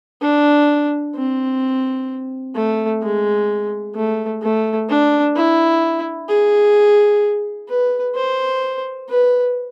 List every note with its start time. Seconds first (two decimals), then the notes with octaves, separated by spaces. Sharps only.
0.22 D4
1.15 C4
2.55 A3
3.02 G#3
3.95 A3
4.42 A3
4.89 D4
5.36 E4
6.28 G#4
7.69 B4
8.15 C5
9.09 B4